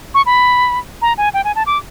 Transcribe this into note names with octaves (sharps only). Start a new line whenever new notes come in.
C#6
B5
A#5
G#5
G5
G#5
A5
D6